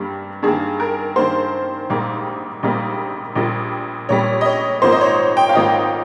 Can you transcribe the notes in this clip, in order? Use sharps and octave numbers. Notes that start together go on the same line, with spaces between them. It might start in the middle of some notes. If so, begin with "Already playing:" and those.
Already playing: G2 G3 A#3
G2 D#3 A#3 G#4
A#4
G2 D#3 A#3 C5
A#1 G#2 G3 A#3
A#1 G#2 G3 A#3
A#1 A#2 G3
A#1 A#2 G3 C#5
D#5
C#5
G#1 G#2 F3 A#3 C5
D#5
C#5
G5
F5
G#1 G#2 F3 A#3 D#5